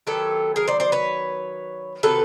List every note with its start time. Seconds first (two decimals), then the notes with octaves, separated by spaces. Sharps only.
0.07 D#3 F#3 B3 G4 A4
0.56 G#4 A#4
0.68 C5 D5
0.80 C5 D5
0.92 B4 C#5
2.03 C3 D#3 F#3 A4 B4